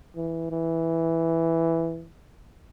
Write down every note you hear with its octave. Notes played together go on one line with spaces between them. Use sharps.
E3
E3